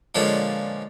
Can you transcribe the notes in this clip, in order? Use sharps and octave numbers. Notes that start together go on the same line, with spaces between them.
A#2 D3 F3 G#3 C#4